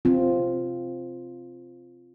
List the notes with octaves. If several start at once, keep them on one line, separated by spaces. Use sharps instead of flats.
C4 F4